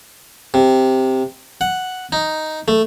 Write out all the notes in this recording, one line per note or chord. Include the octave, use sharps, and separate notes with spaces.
C3
F#5
D#4
A3